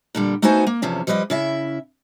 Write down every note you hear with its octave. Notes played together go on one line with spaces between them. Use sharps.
A#2 D3 G3
A3 B3 D#4 F#4 C5 G#5
A#3
E2 C3 F3 C#4
F3 G3 B4 D5 D#5
C#3 E4 E5